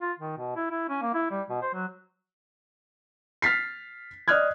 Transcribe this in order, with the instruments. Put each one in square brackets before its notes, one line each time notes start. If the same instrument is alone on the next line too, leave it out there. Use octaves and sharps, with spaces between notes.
[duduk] F4
D#3
B2
E4
E4
C#4
A#3
E4
G3
B2
C5
F#3
[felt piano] F6 A6 B6 C7
D5 D#5 D#6 F6 F#6 G#6